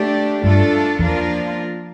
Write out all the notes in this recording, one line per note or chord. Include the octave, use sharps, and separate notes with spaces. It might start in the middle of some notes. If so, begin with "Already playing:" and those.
Already playing: A3 D4 G4
G2 A3 D4 F4 A4
E2 F3 A#3 D4 F4 A#4